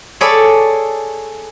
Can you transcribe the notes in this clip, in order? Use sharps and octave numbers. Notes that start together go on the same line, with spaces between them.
G#4 A4 C#5 D5 B5